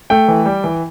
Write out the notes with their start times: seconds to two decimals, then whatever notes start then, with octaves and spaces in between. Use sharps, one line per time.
0.10 A3 G5
0.28 E3
0.46 G3
0.64 E3